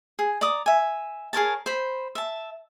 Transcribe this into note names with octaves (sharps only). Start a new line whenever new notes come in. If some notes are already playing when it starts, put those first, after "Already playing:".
G#4
D5 A#5 D6 D#6
E5 G#5
G#4 A#4 C#5 A5
C5 B5
E5 A5